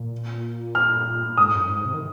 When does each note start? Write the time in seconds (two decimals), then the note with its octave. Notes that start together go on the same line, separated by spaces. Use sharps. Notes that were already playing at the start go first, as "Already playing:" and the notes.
Already playing: A#2
0.75 F6
1.37 G#2 D#6
1.54 F#2
1.69 G#2
1.85 C3
1.94 D#3